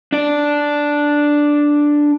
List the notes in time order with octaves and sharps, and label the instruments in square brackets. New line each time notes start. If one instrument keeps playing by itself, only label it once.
[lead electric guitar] D4 D5